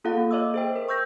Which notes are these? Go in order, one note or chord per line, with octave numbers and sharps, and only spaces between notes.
A#3 F4 G#4 A4 F5 F#5
A#3
C#5 D#5 E5 D6 E6
G#4 C5 G5
A#4 C5
C#6 E6 G6 A#6